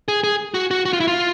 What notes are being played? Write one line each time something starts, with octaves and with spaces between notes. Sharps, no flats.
G#4
G#4
F#4
F#4
F#4
F4
E4
F4